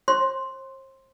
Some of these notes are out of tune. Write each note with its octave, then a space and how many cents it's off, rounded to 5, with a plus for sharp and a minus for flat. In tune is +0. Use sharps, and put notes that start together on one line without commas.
C5 +40 C6 +0